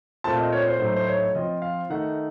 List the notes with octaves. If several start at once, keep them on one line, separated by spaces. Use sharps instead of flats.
A#2 A3 C4 F4 A5
D#5
C#5
C5
A2 F#3 A3 D#4 C5
C5
C#5
F3 C4 F4 D#5
F5
D#3 A3 D#4 F#5